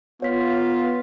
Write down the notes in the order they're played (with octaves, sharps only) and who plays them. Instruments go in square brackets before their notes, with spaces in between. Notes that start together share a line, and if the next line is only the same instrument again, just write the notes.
[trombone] B3 [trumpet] F4 [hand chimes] C#5 B6